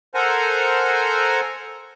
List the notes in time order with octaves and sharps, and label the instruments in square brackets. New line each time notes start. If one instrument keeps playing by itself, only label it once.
[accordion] A4 A#4 C5 F#5 G#5 A#5